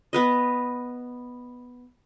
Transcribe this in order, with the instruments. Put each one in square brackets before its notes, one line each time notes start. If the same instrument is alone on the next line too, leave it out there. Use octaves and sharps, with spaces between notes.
[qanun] B3 B4 D#5